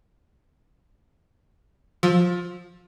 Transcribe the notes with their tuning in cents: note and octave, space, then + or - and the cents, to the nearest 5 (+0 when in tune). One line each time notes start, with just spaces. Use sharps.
F3 +20 E6 +0